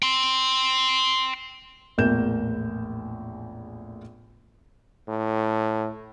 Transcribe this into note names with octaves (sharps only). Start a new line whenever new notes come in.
G5 C6
A#1 E2 A2 A#4 G6 E7
A2